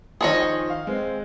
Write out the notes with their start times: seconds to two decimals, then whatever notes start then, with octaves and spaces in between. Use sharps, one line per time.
0.21 D#3 F3 G#4 C5 C#5 D#5
0.70 F5
0.87 G#3 C4